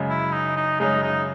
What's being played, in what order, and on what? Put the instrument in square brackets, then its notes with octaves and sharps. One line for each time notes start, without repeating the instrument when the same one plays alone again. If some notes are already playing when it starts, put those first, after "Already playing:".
Already playing: [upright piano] F#2 C#3 G#3
[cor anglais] E4
D#4
D#4
[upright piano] F#2 C#3 G#3 [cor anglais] D#4
[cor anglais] D#4